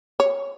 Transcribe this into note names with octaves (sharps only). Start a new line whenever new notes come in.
C#5